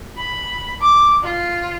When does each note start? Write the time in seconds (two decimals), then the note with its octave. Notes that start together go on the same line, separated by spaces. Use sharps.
0.16 B5
0.80 D6
1.23 F4